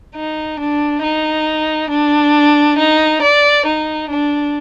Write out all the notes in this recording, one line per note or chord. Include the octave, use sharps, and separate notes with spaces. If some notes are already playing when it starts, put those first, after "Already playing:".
D#4
D4
D#4
D4
D#4
D5
D#4
D4